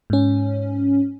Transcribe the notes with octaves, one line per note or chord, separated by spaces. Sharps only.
G#2 C#4